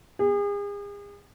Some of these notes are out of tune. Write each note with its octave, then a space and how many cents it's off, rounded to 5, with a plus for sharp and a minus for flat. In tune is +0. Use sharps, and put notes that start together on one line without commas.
G#4 -40